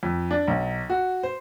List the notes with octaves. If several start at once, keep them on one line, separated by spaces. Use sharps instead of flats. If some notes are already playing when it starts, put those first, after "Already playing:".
F2
D4
B1
F#4
C5